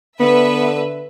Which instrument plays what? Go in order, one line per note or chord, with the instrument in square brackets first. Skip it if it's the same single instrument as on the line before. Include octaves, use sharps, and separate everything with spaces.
[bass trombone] D3 [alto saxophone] B3 [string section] B4 E5